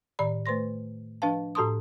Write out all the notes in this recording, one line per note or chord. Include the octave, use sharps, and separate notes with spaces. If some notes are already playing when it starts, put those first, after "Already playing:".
A2 D#3 D5 B5
A3 B4 C5 C6 A#6
F3 D4 B4 F5 A5
A2 F#4 A4 A5 C6 D#6